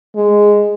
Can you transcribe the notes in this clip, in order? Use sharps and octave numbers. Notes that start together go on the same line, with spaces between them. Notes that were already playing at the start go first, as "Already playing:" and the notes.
G#3